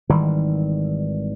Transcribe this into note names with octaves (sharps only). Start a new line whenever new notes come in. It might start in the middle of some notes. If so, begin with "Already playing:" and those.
G#1 D#3 E3 G3